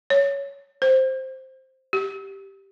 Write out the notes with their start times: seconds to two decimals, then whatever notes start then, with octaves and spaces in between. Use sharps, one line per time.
0.10 C#5
0.82 C5
1.93 G4